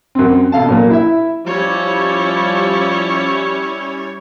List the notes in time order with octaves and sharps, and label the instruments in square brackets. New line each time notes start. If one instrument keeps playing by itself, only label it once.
[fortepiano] F#2 C4
B2 A4 F5 A5
A#2 F#3 A#3
E4 E5
[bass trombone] F3 [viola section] G3 C#4 E4 [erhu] C#5